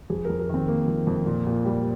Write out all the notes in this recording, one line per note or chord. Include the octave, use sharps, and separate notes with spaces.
F2 G#4
F2 A#4
A#4
D#3 C4
A#3
F2
F2
A#2
A#2
G3